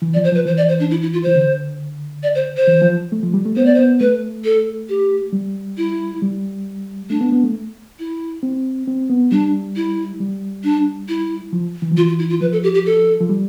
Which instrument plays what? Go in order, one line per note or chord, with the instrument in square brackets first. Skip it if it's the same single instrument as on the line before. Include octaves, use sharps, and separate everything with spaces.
[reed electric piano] E3
[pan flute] D5
[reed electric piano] F3
[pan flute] C5
[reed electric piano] F3 [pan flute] B4
[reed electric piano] E3 [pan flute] C5
[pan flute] D5
C5
D4
E4
E4
F4
[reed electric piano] E3 [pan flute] C5
[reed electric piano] D3
[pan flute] D5
C5
C5
[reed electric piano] E3
F3
A3
F3
G3
A3
[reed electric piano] B3 [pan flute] C5
[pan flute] D5
C5
[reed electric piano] B3
[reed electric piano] A3 [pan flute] B4
[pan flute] A4
G4
[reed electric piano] G3
[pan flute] E4
[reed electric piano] G3
[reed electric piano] A3 [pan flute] D4
[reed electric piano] B3
B3
A3
[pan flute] E4
[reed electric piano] C4
C4
B3
[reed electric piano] G3 [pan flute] D4
[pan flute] E4
[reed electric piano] G3
[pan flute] D4
E4
[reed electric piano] F3
E3
F3
[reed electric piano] E3 [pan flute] F4
[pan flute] F4
E4
F4
[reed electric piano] F3 [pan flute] B4
[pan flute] A4
G4
G4
A4
[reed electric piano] F3
G3